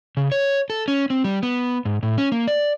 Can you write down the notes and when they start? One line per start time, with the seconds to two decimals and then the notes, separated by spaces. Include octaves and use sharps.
0.17 C#3
0.32 C#5
0.70 A4
0.88 C#4
1.10 C4
1.25 G3
1.43 B3
1.85 G#2
2.03 A2
2.18 C#4
2.32 A#3
2.47 D5